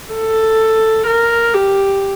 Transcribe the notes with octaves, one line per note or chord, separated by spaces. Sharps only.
A4
A#4
G4